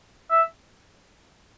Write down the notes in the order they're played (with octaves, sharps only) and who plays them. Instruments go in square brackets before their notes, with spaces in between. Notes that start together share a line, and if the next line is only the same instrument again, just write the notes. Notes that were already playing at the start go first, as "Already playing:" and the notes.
[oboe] E5